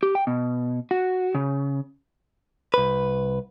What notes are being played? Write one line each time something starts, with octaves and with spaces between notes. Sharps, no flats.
G4
G5
B2
F#4
C#3
C2 B4